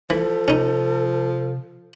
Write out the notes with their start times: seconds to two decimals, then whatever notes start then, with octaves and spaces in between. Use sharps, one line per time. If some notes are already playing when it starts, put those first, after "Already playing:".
0.10 E3 F3 A4
0.48 C3 C#4 D#4